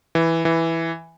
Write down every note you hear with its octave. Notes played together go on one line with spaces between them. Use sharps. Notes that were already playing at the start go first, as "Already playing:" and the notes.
E3
E3